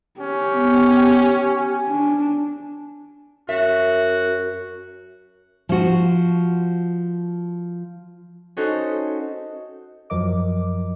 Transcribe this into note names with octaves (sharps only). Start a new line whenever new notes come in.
C#4 G4
B3
G#5
D4
F#2 F#4 E5
F3 F#4
C#4 D#4 F#4 A4 C5
F#2 F3 F#3 A#4 D#5 D6